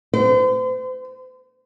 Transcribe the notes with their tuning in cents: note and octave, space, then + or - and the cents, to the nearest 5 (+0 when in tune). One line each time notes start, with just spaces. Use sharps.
C5 -40